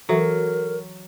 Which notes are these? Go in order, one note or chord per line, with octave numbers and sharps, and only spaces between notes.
E3 F#3 A4 A#4 E5